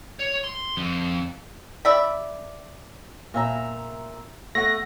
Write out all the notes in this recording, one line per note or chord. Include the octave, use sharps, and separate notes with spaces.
C#5
C6
F2
D5 E5 B5
A#2 E5 A#5
A3 F#5 A#6